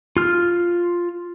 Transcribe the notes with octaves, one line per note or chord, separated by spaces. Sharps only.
F4 F6